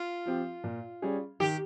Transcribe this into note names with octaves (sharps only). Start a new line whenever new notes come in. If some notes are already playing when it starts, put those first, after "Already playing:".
Already playing: F4
F3 C4 G4
A#2
G3 C#4 G#4
D#3 G4